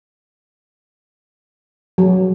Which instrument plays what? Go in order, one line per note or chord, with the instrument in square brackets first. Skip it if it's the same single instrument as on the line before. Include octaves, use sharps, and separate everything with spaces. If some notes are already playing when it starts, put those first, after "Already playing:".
[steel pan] F#3